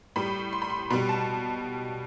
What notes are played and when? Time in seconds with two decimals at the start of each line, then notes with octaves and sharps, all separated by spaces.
0.16 A2 G3 B5
0.53 C6
0.62 B5
0.70 C6
0.90 B2 G3 B5
1.09 A5